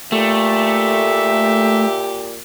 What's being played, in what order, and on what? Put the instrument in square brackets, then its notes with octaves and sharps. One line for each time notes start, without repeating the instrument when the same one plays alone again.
[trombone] A#2 [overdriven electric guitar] A3 [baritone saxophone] G4 [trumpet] E5